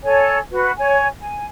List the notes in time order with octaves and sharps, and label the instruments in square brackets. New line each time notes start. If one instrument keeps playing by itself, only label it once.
[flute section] A4 C#5 G#5
F#4 B4
C#5 G#5
G#5